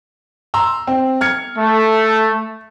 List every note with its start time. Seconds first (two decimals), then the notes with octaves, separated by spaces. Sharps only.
0.54 A#5 C6 E6
0.87 C4
1.21 F6 G#6 C#7
1.57 A3